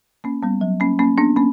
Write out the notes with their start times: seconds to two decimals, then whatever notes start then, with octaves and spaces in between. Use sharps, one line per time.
0.24 A#3 C#4
0.43 G3 B3
0.61 F#3
0.80 A#3 C#4
0.99 A#3 C#4
1.18 B3 D4
1.36 A#3 C#4